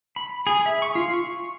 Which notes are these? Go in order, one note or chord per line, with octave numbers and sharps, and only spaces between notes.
B5
G#4
E5
C#6
F4
C#6